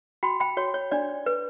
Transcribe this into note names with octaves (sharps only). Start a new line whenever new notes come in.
F#4 G5 B5
G5 B5
F#4 C#5
C#5
D4 D5
B4